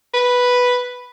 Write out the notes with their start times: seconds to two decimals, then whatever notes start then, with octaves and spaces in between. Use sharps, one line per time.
0.14 B4